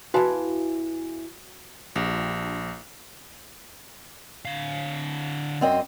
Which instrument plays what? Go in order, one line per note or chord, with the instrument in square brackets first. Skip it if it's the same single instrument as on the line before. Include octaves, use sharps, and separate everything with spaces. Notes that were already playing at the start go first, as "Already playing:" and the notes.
[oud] E2 E3 F5 [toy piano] F#4 G#5 [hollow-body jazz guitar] B4 A5
[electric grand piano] A#1 [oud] D4 F4 G4
[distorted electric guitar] D3 F5
[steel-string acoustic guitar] F#2 C4 D#5